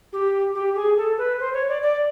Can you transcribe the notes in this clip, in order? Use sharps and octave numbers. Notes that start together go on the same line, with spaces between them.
G4
G4
G#4
A4
B4
C5
C#5
D5
D5